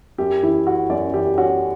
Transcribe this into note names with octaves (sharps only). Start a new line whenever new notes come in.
F#2 G4
E3 E4
C#4 F#4
F#2 D5
E3 G4
C#4 F#4